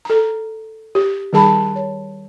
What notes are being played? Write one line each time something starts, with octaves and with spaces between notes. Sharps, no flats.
A4 A#5
G4
D#3 G3 G#4 A5 B5
C#5